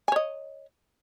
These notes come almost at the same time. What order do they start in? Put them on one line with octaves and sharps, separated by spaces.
G#5 C#5 D#5